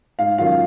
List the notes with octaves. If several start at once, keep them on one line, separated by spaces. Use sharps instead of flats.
G#2 F5
D#3 F#3 C#4 F4 F5